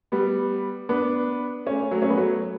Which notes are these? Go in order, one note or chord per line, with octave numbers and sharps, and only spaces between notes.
G3 B3
B3 D4
A3 C#4
F#3 A3
C#4
B3
F#3 A3